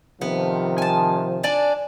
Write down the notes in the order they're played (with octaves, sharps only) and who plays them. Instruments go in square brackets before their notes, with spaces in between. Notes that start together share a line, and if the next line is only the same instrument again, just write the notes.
[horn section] C3 D#3 F3 [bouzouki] B3
[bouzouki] G#5 A5
D4 D5 G#5